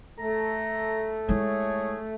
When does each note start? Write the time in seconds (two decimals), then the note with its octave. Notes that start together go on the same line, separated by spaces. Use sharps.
0.19 A3 A4 A#5
1.29 G#3 E4 G#4 C#5